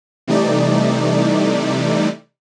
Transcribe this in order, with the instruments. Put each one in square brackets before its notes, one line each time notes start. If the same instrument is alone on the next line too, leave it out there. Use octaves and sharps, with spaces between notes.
[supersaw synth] C3 E3 G3 A3 D#4 D5